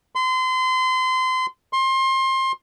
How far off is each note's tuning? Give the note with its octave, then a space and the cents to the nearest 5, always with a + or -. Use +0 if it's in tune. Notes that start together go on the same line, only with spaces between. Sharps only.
C6 -30
C6 +25